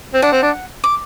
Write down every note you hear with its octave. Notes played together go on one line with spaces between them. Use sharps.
C4
D4 F#5
C4
D4
D6